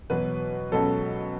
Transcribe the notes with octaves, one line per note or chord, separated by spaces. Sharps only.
E2 B2 F#3 B4
C#2 B2 F#3 A4